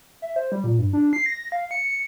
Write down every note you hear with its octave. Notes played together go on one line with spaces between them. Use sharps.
E5
C5
G3
A#2
G2
D4
C7
A#6
F5
C#7